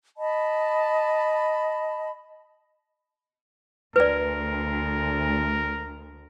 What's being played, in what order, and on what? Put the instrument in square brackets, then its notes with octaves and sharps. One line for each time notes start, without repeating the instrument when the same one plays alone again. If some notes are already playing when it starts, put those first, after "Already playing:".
[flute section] D#5 A5 B5
[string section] D2 [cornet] A#4 [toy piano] B4 D5